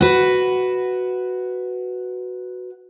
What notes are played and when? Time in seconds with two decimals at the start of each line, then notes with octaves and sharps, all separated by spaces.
0.01 F#4 B4